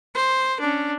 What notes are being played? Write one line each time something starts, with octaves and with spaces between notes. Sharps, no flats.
C5
C#4 D4